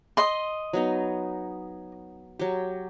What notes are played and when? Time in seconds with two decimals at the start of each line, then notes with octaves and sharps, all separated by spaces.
0.17 D#5 C6
0.73 F#3 B3 D#4
2.39 F#3 G4